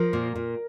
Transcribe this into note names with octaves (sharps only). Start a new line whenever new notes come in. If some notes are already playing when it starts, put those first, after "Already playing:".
Already playing: F3 A#4
A#2
A#2